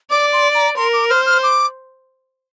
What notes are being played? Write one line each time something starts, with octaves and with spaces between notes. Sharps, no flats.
D5 D6
C6
A#5
A#4 C6
D6
C5 F6
F6
D6